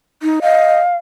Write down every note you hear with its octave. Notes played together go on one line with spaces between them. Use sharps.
D#4
D#5 F5